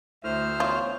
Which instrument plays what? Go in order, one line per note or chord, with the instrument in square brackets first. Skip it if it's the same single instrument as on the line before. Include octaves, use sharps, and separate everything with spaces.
[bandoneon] D2 C5 F6 [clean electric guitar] A2 [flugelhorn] E5
[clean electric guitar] E2 C#5 [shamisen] F4